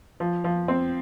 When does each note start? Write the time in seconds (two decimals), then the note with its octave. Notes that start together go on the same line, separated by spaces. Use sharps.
0.20 F3
0.44 F3
0.68 C4